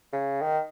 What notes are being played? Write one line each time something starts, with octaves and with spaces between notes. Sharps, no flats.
C#3
D#3